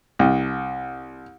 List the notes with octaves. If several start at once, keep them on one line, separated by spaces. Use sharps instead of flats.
C2